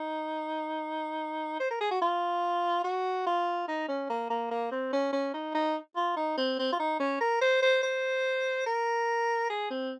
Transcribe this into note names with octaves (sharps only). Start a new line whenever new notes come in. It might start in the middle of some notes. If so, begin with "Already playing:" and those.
Already playing: D#4
C5
A#4
G#4
F#4
F4
F#4
F4
D#4
C#4
A#3
A#3
A#3
C4
C#4
C#4
D#4
D#4
F4
D#4
C4
C4
F4
D#4
C#4
A#4
C5
C5
C5
A#4
G#4
C4